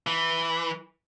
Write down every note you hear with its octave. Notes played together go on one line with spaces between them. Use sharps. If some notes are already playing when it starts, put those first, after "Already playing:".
E3